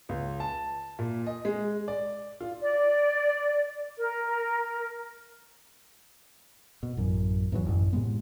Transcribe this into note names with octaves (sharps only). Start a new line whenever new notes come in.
C#2
A5
A#2
D#5
G#3
D5
F4
D5
A#4
B2
A1 F#2
E2 G#2 E3 F#3
A1 F#2
A2 C3 G#3 B3